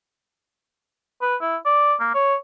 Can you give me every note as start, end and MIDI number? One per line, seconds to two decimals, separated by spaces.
1.22 1.36 71
1.41 1.57 64
1.66 1.94 74
2.00 2.13 58
2.15 2.35 73